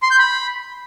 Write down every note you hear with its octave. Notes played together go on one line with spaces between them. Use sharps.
C6
G6
B5